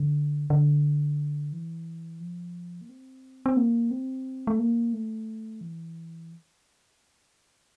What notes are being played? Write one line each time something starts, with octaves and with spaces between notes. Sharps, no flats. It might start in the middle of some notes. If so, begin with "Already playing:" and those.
Already playing: D3
D3
E3
F3
A#3
C4
C4
A#3
C4
A3
A#3
A3
E3